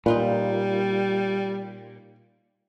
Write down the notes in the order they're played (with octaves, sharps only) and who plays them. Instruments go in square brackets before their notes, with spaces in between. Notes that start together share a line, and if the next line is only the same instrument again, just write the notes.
[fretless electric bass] A#2 [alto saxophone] G3 [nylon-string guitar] D#4 F4 B4